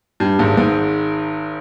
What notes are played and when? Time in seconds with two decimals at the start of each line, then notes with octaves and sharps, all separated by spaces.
0.20 G2
0.39 G#1 G#2
0.57 G#1 G#2